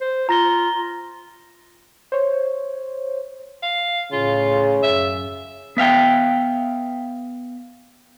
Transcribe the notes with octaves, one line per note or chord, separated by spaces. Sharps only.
C5
F4 A#5 A#6 G7
C5 C#5
F5
A2 C#3 F4
F#2 E5
B3 E5 F5 G5